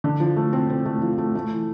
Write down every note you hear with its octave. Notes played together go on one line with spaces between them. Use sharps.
D3
F3
A3
C4
C4
A3
F3
A3
A3
E3